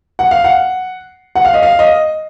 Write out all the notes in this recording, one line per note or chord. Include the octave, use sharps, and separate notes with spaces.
F#5
F5
F#5
F#5
F5
D#5
F5
D#5